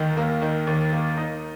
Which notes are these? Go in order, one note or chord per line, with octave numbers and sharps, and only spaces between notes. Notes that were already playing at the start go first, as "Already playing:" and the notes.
Already playing: D#2 D#3
A#3
D#3
D#2
A#3
D#4